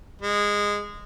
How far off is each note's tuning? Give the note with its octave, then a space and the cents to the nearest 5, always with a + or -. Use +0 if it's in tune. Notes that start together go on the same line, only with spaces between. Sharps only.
G#3 -15